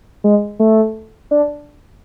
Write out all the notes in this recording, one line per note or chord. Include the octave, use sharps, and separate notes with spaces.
G#3
A3
D4